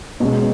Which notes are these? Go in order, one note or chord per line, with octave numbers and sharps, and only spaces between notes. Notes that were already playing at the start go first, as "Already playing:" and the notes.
B2 G#3 C#4